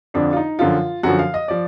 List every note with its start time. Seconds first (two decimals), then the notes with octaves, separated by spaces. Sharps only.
0.14 F2 D3 F3 D4
0.33 F4
0.37 D#4
0.59 F#2 D3 F3 F4
1.03 F#2 D3 F3 F#4
1.19 F5
1.34 D#5
1.48 F3 D5